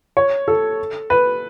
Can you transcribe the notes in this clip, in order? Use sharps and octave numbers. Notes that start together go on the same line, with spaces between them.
C#5
A4
B4